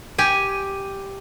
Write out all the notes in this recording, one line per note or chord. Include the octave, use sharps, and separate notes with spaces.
G4 G#5